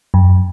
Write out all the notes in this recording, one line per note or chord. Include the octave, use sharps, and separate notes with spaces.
F#2